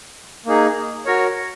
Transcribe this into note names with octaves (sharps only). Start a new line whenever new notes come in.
A#3 D#4 G#4
F#4 A#4 C#5